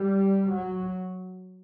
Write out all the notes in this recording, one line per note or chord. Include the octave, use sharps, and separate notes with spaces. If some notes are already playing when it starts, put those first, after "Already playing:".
Already playing: G3
F#3